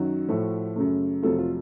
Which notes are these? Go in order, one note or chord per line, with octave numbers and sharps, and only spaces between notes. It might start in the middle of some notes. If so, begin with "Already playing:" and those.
Already playing: F#2 D#3 F#3 F#4
A2 F3 A3
F#2 C#3 A3
F2 C3 F#3 A3 F4 A4
F4 A4